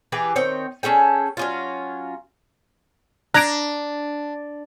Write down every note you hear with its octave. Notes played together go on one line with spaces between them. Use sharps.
E3 G4 G#4 B4
D#3 C4 C#5 G5
C#4 G#4 A4 G5
F#3 C#4 F4
D4 A#5 F#6 G#6 D7